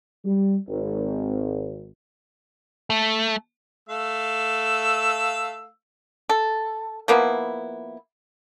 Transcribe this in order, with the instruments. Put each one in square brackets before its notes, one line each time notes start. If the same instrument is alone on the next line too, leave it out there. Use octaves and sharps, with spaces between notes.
[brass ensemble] G3
G#1
[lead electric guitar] A3
[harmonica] A3 F5 E6
[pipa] A4
F3 A#3 B3 E4